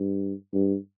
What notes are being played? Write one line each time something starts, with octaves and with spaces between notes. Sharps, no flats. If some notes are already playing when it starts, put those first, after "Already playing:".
Already playing: G2
G2